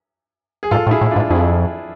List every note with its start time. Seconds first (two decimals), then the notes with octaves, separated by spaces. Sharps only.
0.63 G#4
0.71 G#2 F4 A4
0.87 A2
0.91 E4 G#4
1.01 A2
1.11 G#2 D4 F4
1.30 F2 E4 G#4